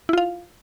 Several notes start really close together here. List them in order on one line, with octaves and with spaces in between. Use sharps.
E4 F4 F5